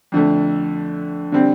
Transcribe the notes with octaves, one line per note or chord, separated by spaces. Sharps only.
F2 D3 A3
D3 G3 C4